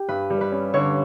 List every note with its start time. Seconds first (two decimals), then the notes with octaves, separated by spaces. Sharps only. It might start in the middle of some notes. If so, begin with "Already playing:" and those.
Already playing: G4
0.09 G2 B4
0.30 G3
0.41 B4
0.52 C#4
0.74 D3 C#5